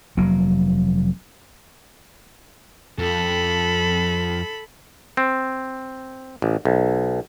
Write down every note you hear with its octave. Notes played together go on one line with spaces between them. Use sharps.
F1 F#3 A#3
F2 A4 B5
C4
A1
B1